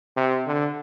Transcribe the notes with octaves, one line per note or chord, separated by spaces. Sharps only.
C3
D3